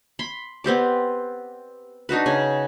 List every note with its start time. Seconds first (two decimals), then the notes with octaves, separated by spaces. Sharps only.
0.19 B5 C6
0.64 B3 C4 G4 D5
2.09 D4 D#4 F#4 B4
2.26 C#3 G#5